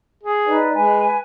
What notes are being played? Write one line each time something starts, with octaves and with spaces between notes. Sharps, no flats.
G#4
D#4 B4 D5
G#3 B4 G#5